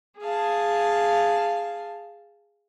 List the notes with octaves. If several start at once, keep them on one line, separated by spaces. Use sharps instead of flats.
G#4 F5 A5